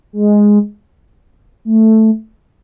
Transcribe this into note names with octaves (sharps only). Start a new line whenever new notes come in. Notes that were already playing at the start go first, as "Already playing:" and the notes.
G#3
A3